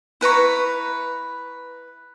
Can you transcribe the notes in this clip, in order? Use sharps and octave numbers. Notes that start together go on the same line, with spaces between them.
E4 B4 A#5 C#6